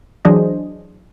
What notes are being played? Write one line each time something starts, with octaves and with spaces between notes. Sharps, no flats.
E3 F#3 D4 G#4 C5 D#5